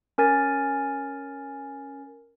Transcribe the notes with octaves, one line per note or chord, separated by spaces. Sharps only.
C#4 A#4 G#5 A6